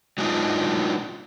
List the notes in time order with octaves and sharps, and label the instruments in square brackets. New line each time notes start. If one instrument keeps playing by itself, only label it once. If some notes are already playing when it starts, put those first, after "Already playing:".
[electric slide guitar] F#3 G#3 B3 D4 D#4 F4